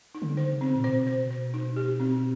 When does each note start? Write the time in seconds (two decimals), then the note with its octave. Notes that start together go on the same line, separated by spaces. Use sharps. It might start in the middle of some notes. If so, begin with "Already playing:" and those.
0.15 D#4
0.22 D3
0.37 C5
0.53 C#3
0.61 C4
0.75 A#2
0.84 B2 C5
1.07 C5
1.31 C5
1.54 D#4
1.76 G4
2.00 C4